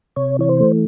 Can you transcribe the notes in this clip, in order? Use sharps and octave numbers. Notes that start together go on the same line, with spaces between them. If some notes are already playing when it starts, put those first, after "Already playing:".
C3 C#5
E3 C#5
C5
A3